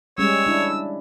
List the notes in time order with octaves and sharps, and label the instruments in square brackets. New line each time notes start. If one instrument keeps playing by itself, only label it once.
[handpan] G3 G#3 C#4 [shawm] C#5 [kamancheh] E6
[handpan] D4 E4